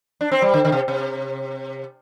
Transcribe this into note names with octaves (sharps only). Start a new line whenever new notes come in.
D4
C4
G3
D3
D3
C3
C3